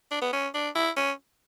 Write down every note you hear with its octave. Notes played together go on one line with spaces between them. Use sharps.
D4
B3
C#4
D4
E4
C#4